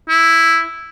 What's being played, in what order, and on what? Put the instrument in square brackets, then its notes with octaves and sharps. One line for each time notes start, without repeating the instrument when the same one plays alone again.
[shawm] E4